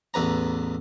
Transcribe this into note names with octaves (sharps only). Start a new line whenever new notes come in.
A1 E2 B4 A#5